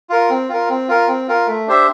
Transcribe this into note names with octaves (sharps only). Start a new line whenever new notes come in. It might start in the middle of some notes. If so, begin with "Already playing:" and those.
F4 A#4
C4
F4 A#4
C4
F4 A#4
C4
F4 A#4
A3
D4 G4 C5 E5